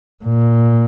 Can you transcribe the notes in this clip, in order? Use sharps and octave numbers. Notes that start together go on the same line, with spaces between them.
A#2